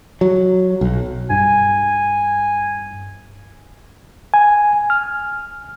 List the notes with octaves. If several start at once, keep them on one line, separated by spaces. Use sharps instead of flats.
F#3
B1
G2 G#5
G#5
F6